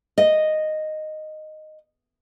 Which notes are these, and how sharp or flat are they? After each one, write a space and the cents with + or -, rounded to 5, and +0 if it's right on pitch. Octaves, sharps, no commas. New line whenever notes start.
D#5 -5